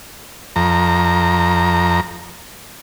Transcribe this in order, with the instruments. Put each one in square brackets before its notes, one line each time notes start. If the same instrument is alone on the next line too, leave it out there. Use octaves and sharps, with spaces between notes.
[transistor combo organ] F2 A#5